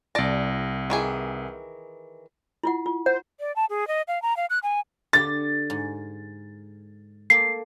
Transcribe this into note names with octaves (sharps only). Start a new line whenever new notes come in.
C2 D5 A5 A#6
D#3 E3 G#4
E4 F4 F#5
F4
C5 F#5
D5
A5
G#4
D#5
F5
A#5
F5
F#6
G#5
D3 G4 A6
G#2
A#3 A4 C7